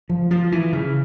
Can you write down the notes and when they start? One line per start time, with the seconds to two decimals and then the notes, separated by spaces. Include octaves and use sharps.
0.09 F3
0.31 F3
0.52 E3
0.73 C#3